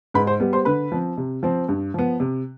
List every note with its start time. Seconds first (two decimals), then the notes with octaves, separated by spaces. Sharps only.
0.14 G#2 B4 B5
0.27 C5 C6
0.40 G3 B3
0.53 C5 C6
0.65 D3 B4 B5
0.92 F3 C4
1.17 C3
1.43 F3 C4
1.69 G2
1.94 F3 B3
2.20 C3